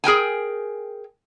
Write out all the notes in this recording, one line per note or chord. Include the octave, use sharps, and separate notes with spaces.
G#4 A#4 G5 G#5